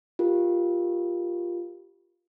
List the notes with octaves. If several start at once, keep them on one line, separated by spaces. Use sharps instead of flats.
F4 G4 A#4